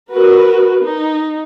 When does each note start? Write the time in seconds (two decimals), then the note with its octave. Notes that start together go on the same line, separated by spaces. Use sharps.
0.11 F#4 A#4 B4
0.84 D#4